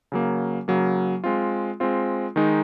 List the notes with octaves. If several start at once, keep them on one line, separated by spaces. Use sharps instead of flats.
C#3 F#3 A#3
C#3 F#3 A#3
G#3 C4 F4
G#3 C4 F4
D#3 G#3 D#4